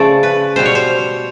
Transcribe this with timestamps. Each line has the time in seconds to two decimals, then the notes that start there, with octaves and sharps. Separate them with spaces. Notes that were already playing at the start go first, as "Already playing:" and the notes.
Already playing: C#3 F3 A3 D5
0.23 B4
0.56 B2 G3 C5
0.65 C#5
0.75 C5